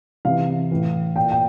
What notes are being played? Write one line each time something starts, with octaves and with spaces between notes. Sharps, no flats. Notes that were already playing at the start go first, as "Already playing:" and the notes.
C3 E3 F5
A2 E3
A#2 G5
G5